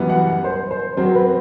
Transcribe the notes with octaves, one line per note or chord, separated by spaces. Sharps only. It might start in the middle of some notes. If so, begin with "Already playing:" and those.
Already playing: F#2 E3 G3 B3
F#5
F#5
C5
C5
F#2 F#3 C4 C5
B4